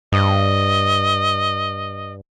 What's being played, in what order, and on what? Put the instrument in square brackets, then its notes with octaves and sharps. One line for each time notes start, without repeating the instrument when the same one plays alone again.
[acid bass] G2 [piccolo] D#5